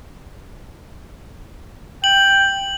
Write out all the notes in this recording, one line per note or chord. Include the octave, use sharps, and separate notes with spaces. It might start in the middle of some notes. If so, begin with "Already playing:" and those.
G5 F#7